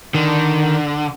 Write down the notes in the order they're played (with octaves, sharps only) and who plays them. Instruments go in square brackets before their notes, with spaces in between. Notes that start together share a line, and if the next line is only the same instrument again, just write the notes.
[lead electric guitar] D3 [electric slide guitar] D#3